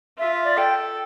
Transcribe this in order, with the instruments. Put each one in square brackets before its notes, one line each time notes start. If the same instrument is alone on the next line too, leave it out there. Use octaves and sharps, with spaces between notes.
[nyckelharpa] F4 [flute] E5
[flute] E5
D5
[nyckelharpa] A4 [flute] G5